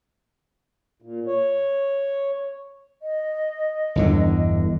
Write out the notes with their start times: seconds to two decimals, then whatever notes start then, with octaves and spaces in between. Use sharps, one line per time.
1.02 A#2
1.27 C#5
3.02 D#5
3.95 G1 E2 D3